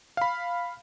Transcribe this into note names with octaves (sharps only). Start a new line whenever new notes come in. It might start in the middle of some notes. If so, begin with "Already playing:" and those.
F5 B5